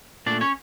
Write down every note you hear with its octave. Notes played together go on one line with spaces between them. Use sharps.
A#2 A3 D4 D5
C#4 C#5